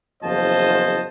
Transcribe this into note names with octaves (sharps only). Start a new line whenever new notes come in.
F#1 E2 F3 C5 D#5 A5